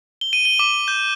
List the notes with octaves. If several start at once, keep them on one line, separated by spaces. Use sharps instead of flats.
G7
D#7
G7
D6
G6